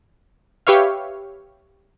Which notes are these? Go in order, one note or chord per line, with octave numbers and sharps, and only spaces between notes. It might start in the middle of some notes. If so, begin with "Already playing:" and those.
G4 B4 C#5 E5 F5